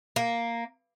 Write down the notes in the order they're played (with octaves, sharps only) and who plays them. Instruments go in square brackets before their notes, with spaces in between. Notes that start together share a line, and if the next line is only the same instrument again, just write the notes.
[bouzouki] A#3